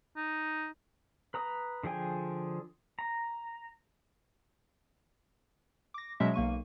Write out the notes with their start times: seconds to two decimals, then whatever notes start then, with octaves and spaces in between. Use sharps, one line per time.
0.17 D#4
1.34 B4 A#5 D#6
1.83 D3 F3 G#4 G5 G#5
2.99 A#5
5.94 D6 A#6
6.20 B2 F#3 G#3 C#4 E5
6.34 B1 A#3 C#6 D#7